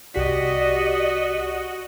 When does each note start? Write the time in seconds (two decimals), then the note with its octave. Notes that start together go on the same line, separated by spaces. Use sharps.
0.15 C2 F#4 G4 D5 D#5 B6